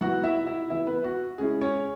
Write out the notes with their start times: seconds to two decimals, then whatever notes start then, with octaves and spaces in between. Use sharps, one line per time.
0.01 F#3 B3 E4 F#4 F#5
0.24 E4 E5
0.46 E4 E5
0.70 E3 B3 E4 E5
0.87 B3 B4
1.04 F#4
1.38 C#3 G#3 C#4 E4 G#4
1.61 C#4 C#5